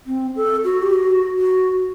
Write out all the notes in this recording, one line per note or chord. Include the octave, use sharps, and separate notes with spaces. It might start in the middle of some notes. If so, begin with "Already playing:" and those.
C4
A4
F#4
G4
F#4
F#4